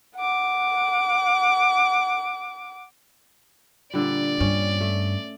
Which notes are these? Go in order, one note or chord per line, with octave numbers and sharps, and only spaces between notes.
F#5 D6
A#2 D3 G3 D5
G2 C#4
A3